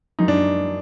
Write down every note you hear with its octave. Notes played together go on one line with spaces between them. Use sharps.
F#2 D#4
D4